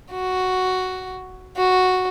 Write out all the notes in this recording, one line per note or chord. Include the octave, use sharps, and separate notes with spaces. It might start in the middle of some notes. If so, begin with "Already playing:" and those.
F#4
F#4